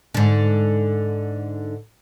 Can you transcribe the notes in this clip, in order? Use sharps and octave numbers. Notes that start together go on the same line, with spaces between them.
G#2 D3